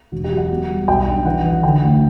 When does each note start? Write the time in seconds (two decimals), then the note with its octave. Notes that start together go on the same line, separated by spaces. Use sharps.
0.12 E1 F#4
0.24 G4
0.32 F#3
0.37 F#5
0.51 B2
0.70 G3
0.88 B1 G5
1.07 D4
1.25 E3 F#5
1.45 E3
1.63 D3 G5
1.83 D2